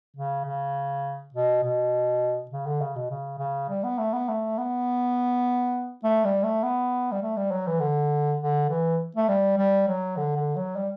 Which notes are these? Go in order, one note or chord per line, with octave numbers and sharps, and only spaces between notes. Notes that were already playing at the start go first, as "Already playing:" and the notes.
C#3
C#3
B2
B2
C#3
D3
C#3
B2
C#3
C#3
G3
B3
A3
B3
A3
B3
A3
G3
A3
B3
G3
A3
G3
F#3
E3
D3
D3
E3
A3
G3
G3
F#3
D3
D3
F#3
G3